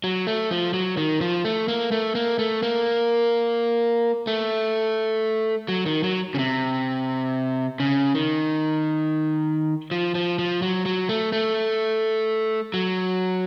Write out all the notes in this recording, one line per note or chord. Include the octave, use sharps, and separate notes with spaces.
F#3
A3
F3
F#3
D#3
F3
A3
A#3
A3
A#3
A3
A#3
A3
F#3
D#3
F#3
C#3
C3
C#3
D#3
F3
F3
F3
F#3
F#3
A3
A3
F#3